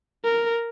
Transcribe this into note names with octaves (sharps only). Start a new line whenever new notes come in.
A#4